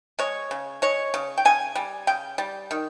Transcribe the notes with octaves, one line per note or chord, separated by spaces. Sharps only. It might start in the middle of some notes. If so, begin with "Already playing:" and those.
G#3 C#5
C#3
G#3 C#5
C#3
G5
C#3 G#5
G3
C#3 G5
G3
D#3